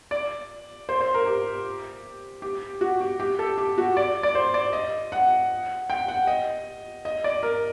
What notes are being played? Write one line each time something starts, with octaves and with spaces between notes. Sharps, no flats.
D5
C5
C5
A#4
G4
G4
F#4
G4
G4
A4
G4
F#4
D5
D5
C5
D5
D#5
F#5
G5
F#5
D#5
D#5
D5
A#4